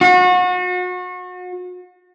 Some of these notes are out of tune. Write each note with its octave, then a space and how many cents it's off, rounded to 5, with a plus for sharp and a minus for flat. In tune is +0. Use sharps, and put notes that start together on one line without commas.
F#4 -35